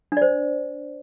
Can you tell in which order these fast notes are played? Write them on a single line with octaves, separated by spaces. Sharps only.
D4 D5 C5